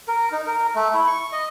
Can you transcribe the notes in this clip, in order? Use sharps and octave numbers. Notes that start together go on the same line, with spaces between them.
A#4
D#4
A#4
A3
E4
C#6
D#5